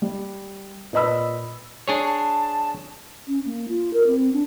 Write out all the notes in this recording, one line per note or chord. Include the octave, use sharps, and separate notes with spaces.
G3
A#2 B4 D#5 B5 E6
D4 G#4 C#5
A5
C#4
A#3
F4
A#4
C4
D4